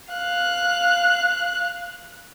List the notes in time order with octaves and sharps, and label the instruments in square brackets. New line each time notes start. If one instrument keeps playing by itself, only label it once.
[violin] F5 F#6